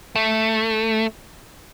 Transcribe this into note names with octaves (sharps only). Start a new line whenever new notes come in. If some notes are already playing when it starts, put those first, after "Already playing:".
A3